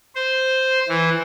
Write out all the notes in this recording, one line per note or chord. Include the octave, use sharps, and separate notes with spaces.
C5
E3